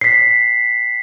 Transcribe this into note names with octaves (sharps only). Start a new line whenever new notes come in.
B6 C7